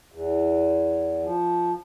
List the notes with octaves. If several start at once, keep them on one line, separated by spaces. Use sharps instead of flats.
E2
F3